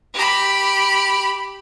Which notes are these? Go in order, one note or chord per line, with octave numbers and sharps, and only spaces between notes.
G4 B5